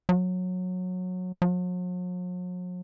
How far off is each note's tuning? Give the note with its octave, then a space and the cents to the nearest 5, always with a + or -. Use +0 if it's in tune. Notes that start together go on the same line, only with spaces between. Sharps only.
F#3 -20
F#3 -45